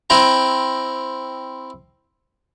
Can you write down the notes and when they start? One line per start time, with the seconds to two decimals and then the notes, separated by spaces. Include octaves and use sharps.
0.10 C4 E4 G5 A#5